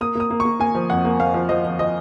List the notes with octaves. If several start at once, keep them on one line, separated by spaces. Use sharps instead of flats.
A#3 D#6
A#3 D#6
A#3
C#6
A#3
A#3 G#5
F3
F2 F#5
A#3
A#3 F5
F3
F3 D#5
F3
F3 D#5